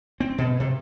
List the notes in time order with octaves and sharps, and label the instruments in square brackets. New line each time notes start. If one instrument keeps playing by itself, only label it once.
[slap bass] C4
B2
C3